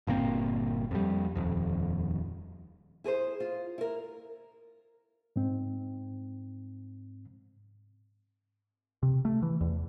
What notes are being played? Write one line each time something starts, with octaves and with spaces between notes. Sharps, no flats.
G1 A#2 A#3 C4
F2 G3
D#1 F2
E4 G#4 A#4 C5
F4
E4 A#4
G#2 C4
C3
A3
E3
E2